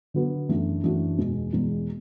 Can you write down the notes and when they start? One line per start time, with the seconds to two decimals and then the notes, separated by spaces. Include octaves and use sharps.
0.14 D3 F#3 B3 F#4
0.49 F#2 E3 A3 D4 F#4
0.83 F#2 E3 A3 D4 F#4
1.18 E2 B2 G#3
1.53 E2 B2 G#3